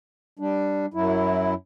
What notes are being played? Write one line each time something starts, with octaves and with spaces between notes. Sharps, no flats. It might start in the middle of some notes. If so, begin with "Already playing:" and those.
G3 D4
F#2 F#3 E4